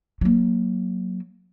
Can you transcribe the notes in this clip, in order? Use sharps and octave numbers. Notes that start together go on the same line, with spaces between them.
F#3 A#3